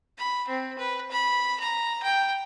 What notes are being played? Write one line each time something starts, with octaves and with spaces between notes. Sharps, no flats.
B5
C4
B4
B5
A#5
G5